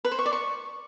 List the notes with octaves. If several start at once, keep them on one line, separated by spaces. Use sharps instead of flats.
B4
C5
C#6
D5
C#6